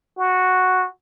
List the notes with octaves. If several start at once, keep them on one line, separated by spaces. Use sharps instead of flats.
F#4